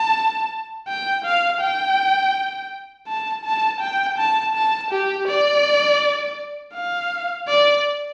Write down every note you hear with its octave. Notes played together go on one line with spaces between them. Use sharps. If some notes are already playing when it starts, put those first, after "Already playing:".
Already playing: A5
G5
F5
G5
A5
A5
G5
A5
A5
G4
D5
F5
D5